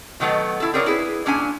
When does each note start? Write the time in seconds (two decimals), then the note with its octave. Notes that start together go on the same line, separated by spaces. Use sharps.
0.20 B2 D#3 F#3 A3 B3
0.60 E4 A4
0.74 C4 G#4 A#4 C#5 D5
0.86 E4 G#4 B4
1.26 A#2 C#4 D4 G#5